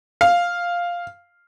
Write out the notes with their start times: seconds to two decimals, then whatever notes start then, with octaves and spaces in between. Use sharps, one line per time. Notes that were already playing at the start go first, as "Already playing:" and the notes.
0.21 F5